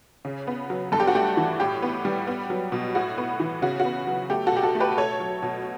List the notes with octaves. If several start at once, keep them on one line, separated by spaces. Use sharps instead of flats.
C#3
B3
F#3
G2 A4
G4
F#4
A3 G4
E3
A2 G4
B3
G3
B3
F#3
B2
A2 F#4
B3
E3
C#3 F#4
F#4
B3
F#3
A3 G4
F#4 A4
B2 G4
F#4 A4
A3
G4 B4
A3 A4 C#5
F#3
B2